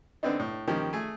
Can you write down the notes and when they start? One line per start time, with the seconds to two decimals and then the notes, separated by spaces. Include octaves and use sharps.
0.23 D3 B3 C4 D4 D#4
0.39 A2
0.67 D#3 F3 A#3 C#4 G4
0.93 A3 G#4 G#5